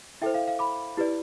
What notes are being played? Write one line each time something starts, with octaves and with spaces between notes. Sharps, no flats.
E4 A4 C5 E5 G5
F5
F5
B5 D6
E4 G4 B4 D5